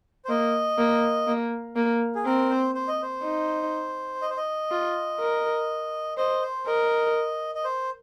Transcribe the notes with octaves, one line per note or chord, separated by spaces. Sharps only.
C5
A#3 D#5
A#3
A#3
A#3
G#4
C4 A#4
C5
C5
D#5
C5
D#4
D#5
C5
D#5
F4
A#4
C5 D#5
C5
A#4 D#5
D#5
C5